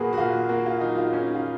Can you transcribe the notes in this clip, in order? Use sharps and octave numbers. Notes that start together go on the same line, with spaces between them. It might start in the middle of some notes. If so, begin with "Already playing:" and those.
Already playing: A#2 F#3 A#3 F#4 G#4 B4
F#4
A#2 F4
A#3 F#4
F4
F#3 D#4
F4
C#4 D#4
F4